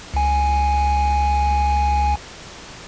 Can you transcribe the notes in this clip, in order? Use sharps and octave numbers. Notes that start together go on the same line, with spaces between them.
C#2 G#5